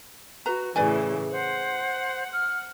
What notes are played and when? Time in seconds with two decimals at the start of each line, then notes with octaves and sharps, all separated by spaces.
0.46 F#4 B4 A#5
0.76 A2 C#3 E3 B4 D5 G#5
1.31 C5 F#5
2.33 F6